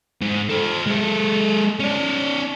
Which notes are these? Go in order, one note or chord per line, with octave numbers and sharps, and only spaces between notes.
G#2
A4 C5
G#3 A4
C#4 D5